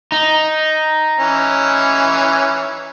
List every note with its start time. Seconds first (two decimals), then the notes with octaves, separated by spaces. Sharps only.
0.12 D#4
1.19 E3 C#4